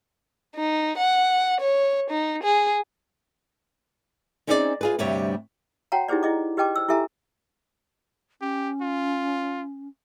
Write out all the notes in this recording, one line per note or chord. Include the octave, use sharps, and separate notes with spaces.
D#4
F#5
C#5
D#4
G#4
C4 C#4 D#4 G#4 C#5 D5
F4 G#4 B4
D2 G2 C3 G3 C#5
F#4 C#5 F#5 G5 A5 A#5
D#4 E4 G4 G#4 C5 D5
E4 G#4 D#5 D6
G4 B4 D#5 G5 A5 D6
C5 E6
E4 G4 A4 E5 G#5 A#5
C#4 G4
F4